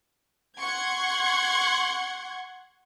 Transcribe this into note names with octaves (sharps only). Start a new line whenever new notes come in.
F#5 C6 C#6 G#6